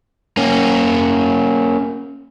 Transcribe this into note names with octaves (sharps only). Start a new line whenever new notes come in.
A#3 C#4